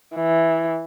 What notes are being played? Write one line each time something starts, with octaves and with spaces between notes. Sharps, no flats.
E3